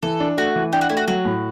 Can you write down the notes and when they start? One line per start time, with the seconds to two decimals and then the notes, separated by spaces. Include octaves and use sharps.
0.03 E3 A4
0.20 D4
0.37 A3 F#4
0.56 E3
0.73 D4 G4
0.81 F#4
0.89 A3 E4
0.97 F#4
1.08 F#3 F#4
1.25 A2